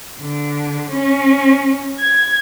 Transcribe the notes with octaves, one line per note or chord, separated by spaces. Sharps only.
D3
C#4
G#6